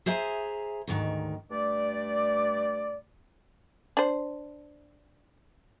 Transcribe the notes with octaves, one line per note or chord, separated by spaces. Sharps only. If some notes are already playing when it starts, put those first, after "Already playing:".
G#4 C5 E5 G#5 A#5
D2 G#2 D#3
G2 A3 D5
D4 C5